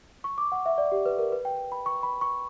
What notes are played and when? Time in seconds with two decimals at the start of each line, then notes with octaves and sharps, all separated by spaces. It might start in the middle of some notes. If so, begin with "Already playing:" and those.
0.24 C#6
0.38 D6
0.52 F#5
0.66 E5
0.78 D5
0.92 G4
1.06 B4
1.18 A#4
1.32 B4
1.45 G5
1.72 B5
1.86 C#6
2.03 B5
2.21 C#6